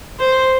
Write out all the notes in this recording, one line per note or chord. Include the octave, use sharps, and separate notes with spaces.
C5